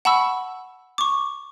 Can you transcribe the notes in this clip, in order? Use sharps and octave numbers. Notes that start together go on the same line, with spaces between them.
F#5 A5 B5 C#6 E6
C#6 D6